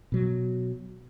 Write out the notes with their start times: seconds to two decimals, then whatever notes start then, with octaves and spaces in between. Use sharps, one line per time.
0.12 B2 F#3